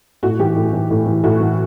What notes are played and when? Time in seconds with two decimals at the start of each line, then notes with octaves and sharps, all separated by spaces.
0.23 A2 F#4
0.39 E3 G4
0.56 A2
0.73 E3
0.90 A2
1.06 E3
1.23 A2 F#4
1.40 E3